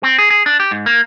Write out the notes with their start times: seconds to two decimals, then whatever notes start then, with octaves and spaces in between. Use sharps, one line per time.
0.03 C4
0.18 G#4
0.30 G#4
0.46 D4
0.60 G4
0.71 G#2
0.86 A#3